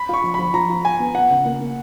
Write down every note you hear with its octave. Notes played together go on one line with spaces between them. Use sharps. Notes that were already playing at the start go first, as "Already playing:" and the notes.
Already playing: B5
F4 C#6
F3
F3 B5
F3 A#5
F4
F4 G#5
B3
F4 F#5
C#3
A#3
A#3